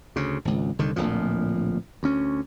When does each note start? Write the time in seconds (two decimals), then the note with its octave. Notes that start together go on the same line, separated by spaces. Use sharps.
0.16 D2 C#3
0.45 G#1 C#2
0.79 C2 D3 D#3
0.96 D1 A#1 A#2 F3
2.03 D2 C#4